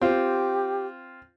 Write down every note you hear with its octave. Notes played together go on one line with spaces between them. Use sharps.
C4 F4 G4